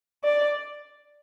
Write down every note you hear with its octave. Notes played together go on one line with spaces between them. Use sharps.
D5